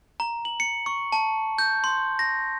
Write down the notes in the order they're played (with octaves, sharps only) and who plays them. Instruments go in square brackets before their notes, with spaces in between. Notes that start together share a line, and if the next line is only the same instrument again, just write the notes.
[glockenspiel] A#5
F#7
C#7
C#6
A5
G6
C6
A#6